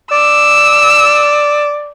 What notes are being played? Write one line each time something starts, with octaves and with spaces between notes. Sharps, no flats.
D5 E6